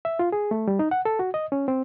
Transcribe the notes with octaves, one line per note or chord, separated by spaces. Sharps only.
E5
F4
G#4
A3
G3
D#4
F#5
A4
F#4
D#5
C#4
C4